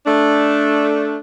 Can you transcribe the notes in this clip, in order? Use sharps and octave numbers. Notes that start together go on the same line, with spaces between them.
A3 D4